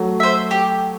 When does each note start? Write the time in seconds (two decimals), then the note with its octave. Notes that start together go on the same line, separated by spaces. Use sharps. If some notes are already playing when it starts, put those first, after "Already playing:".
Already playing: F#3 A3
0.20 C5 E5
0.51 G4